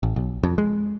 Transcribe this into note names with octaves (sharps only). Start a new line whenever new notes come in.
A1
B1
F2
G#3